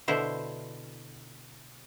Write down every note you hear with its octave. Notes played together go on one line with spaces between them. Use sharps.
B2 D3 E4 C5